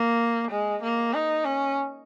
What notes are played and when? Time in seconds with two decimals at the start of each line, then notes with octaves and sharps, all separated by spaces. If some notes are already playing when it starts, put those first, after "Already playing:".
Already playing: A#3
0.51 G#3
0.82 A#3
1.13 D#4
1.45 C#4